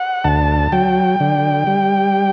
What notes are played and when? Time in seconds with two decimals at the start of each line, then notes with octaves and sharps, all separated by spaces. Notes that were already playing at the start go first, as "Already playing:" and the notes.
Already playing: F#5
0.24 D2 A5
0.72 F#3 G5
1.20 D3
1.67 G3